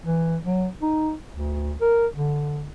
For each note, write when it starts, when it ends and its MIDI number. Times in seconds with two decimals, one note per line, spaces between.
0.05 0.37 52
0.45 0.68 54
0.82 1.14 63
1.31 1.76 38
1.81 2.07 70
2.16 2.66 50